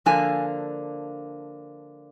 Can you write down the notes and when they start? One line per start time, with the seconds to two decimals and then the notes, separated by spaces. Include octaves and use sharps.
0.06 D3 F3 A#3 D4 G#5